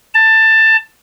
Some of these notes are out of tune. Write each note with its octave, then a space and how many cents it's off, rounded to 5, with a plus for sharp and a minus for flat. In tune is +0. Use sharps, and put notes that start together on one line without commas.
A5 +15